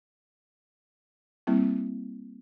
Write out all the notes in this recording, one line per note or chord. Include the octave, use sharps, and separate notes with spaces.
G3 A#3 C4 E4